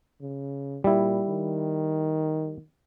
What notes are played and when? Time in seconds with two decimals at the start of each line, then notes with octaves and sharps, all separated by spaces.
0.22 C#3
0.84 A#2 G3 E4
1.28 D#3